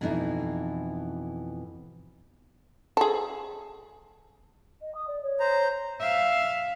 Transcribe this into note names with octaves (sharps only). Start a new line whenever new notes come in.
F2 B2 E3 D#4 E4
G#4 A4
D#5
D#6
D5
C#5
C5 A#5
E5 F5